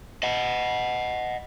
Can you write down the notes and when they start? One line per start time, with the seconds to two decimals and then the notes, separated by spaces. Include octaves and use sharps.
0.23 D#5 F#5